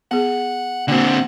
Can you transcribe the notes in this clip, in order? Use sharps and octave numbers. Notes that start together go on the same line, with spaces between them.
B3 G#4 F#5
D3 A#3 C4 F#4 F#5